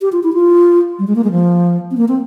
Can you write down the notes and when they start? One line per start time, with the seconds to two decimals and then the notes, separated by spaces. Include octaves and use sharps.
0.01 G4
0.12 F4
0.23 E4
0.34 F4
0.99 G3
1.07 G#3
1.16 A#3
1.24 G#3
1.31 F3
1.91 C4
1.97 A#3
2.08 C4